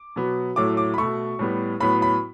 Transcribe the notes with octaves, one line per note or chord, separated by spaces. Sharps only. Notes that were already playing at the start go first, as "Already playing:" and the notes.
Already playing: D6
B2 F#3 B3
A2 F#3 A3 D6
D6
B5
B2 A3 C#6
A2 G3 B3
A2 F#3 B3 B5
B5